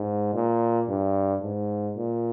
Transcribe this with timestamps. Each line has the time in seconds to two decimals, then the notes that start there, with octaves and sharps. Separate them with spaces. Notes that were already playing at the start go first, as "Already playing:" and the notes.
Already playing: G#2
0.34 A#2
0.88 G2
1.42 G#2
1.96 A#2